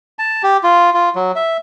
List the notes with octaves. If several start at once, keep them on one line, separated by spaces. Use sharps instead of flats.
A5
G4
F4
F4
F#3
E5